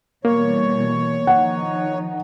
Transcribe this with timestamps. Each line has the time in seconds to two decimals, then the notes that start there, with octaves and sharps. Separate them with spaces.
0.25 B2 E3 G3 A#3 C#5
1.27 D#3 F3 D#4 F#5